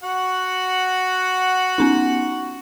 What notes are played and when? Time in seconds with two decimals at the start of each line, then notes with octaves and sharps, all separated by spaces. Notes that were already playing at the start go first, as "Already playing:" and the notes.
0.03 F#4 F#5
1.78 B3 C#4 D#4